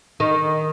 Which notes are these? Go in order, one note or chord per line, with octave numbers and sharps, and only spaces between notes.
D#3